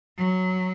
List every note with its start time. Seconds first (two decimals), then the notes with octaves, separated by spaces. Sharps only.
0.17 F#3